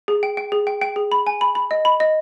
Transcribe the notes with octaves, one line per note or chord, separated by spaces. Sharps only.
G#4
G5
G5
G#4
G5
G5
G#4
B5
G#5
B5
B5
D#5
B5
D#5